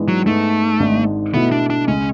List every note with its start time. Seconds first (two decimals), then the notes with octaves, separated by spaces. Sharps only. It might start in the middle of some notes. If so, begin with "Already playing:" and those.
Already playing: G#2 E3 G#3 B3 D4
0.08 F#3
0.26 G#2 G#3 A3 B3
0.80 G#1 G#2 G#3 D4
1.34 B2 A3 B3 E4
1.52 D4
1.70 D4
1.87 C#2 C#3 G#3 C#4